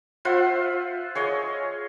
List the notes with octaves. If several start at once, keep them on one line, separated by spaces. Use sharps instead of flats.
F4 C5 E5 F#5
G#4 C#5 D#5